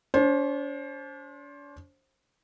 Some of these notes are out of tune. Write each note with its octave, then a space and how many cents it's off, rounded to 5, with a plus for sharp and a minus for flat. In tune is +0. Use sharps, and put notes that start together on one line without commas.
D4 -45 C5 +25